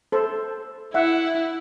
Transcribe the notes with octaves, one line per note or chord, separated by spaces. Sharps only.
A4 C5
E4 E5 F#5